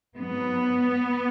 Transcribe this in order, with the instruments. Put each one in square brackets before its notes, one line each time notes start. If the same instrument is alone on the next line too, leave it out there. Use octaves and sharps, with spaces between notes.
[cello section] G#2 F#3 B3